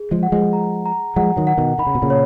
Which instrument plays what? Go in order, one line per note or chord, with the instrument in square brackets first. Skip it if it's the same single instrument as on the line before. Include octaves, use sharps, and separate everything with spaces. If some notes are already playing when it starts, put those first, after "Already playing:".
Already playing: [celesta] G#4
[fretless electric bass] F3 G#3
[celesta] F#5
[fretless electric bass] F3 G#3
[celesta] A#5
A#5
[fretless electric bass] F3 G#3 [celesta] F#5
[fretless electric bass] D#3 F#3
[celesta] F#5
[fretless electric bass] B2 D#3
[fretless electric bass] D#3 [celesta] B5
[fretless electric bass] C#3
B2
A#2 C#3
[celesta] C#5